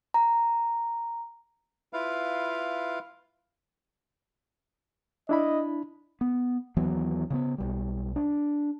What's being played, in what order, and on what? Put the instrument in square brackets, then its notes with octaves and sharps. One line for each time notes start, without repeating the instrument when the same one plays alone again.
[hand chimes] A#5
[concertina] E4 F4 B4 F5
[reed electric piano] D4 E4 B5 [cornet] D#5
[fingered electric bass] B3
D#2 E3 F#3 B3
C#3 A#3 B3
B1 G3
D4